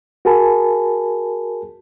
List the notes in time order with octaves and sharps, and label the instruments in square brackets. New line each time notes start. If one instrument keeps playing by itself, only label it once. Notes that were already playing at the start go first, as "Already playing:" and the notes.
[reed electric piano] F#4 G#4 A#4 G#5 A5 B5